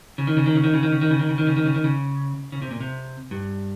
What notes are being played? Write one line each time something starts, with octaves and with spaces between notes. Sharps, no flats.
C#3
D#3
C#3
D#3
C#3
D#3
C#3
D#3
C#3
D#3
C#3
D#3
C#3
D#3
C#3
D#3
C#3
D#3
C#3
C#3
C3
A#2
C3
G2